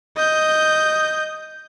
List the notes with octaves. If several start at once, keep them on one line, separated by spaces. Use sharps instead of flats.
D#5 G6